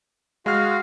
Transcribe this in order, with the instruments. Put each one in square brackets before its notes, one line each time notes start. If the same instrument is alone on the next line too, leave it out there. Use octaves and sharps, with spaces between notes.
[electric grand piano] G#3 F6 [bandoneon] F#4 F5